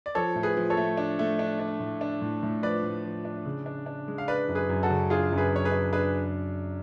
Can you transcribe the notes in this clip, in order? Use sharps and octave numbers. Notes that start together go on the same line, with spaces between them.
D5
F3 A4 C#5
A2
G#4 B4
F3
A4 C#5
A3
D4
A3
D4
D4
A2
D4
A2
A2
F3 B4 D5
A2
F3
D4
C#3
D4
D4
G#3
F5
D4 B4 D5
F#2
G#4 B4
F#2
F#4 A4
C#3
D4 F4 G#4
F#2
G#4 B4
F#2 C#5
G#4 B4
D4
D4 G#4 B4